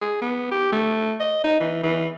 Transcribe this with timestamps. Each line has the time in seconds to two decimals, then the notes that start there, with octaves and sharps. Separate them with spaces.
0.01 G#4
0.22 B3
0.51 G4
0.72 A3
1.20 D#5
1.44 D#4
1.60 E3
1.83 E3